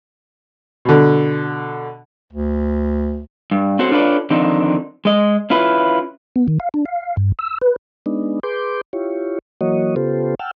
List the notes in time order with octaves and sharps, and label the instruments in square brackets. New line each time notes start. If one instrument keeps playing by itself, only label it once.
[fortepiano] B2 D3
[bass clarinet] D2
[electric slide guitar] G2
C4 C#4 F#4 A4 C5
D4 F4 A4 B4 C#5 D5
D3 D#3 F3 C4 D4 D#4
G#3 D#5
C#4 E4 F4 B4
[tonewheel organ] B3
D#3
F5
D4
F5
G2
E6
B4
G#3 B3 D4 D#4
G#4 B4 C6 D6 G6
E4 F4 G4 C#5
E3 F#3 A#3 F#4 C#5 D#5
C#3 B3 F4 G4 A4 C5
F#5 G5 A5 E6 F6